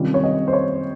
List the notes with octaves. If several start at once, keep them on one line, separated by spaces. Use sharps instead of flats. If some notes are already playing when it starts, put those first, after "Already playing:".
Already playing: C3 D#3 G3 C#4 F4
C#5
D#5
C5
C#5